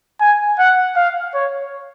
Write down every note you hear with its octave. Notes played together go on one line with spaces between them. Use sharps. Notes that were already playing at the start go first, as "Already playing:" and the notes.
G#5
F#5
F5
C#5